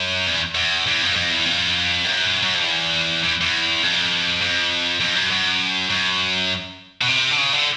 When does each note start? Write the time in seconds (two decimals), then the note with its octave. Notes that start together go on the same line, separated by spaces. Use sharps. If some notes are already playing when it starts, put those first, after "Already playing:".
Already playing: F#2
0.27 E2
0.55 E2
0.86 E2
1.02 F2
1.16 F2
1.30 E2
1.46 F2
2.04 F#2
2.43 F#2
2.54 F2
2.64 E2
3.23 E2
3.41 E2
3.83 F2
4.42 F2
5.00 F2
5.16 F#2
5.31 F#2
5.90 F#2
7.01 B2
7.08 C3
7.31 D3
7.38 C#3
7.52 D3